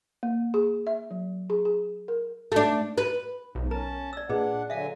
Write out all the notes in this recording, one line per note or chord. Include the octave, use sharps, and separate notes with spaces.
A#3
G#4
E5
F#3
G#4
G#4
A#4
A3 D4
B4
B1 G#2
C#4 A#4 A5 A#5
D5 E6
A#2 D4 G#4 B4 D#5 F#5
D3 F#3 E5 F5 G#5